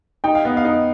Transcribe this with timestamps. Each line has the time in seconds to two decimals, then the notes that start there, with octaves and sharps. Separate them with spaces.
0.24 D#4 G5
0.35 F5
0.45 B3 D#5
0.57 F5
0.65 D#4